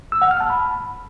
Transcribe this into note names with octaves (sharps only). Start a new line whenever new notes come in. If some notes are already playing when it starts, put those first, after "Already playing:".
E6
F#5
F6
A5
B5